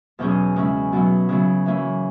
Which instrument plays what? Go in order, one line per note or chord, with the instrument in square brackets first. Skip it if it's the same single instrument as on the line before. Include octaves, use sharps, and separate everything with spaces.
[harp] E2 B2 F#3 C#4 G#4
C#3 G#3 C#4 E4
B2 F#3 B3 E4
C#3 F#3 B3 E4
E3 A#3 C#4 E4